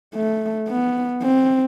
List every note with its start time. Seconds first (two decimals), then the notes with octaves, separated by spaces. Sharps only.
0.15 A3
0.68 B3
1.22 C4